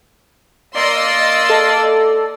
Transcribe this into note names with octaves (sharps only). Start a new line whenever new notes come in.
A#3 D5 D#5 C6 E6
A4